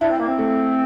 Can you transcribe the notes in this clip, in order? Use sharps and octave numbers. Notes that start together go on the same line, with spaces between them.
D4 E4
C4
A#3
C4
A3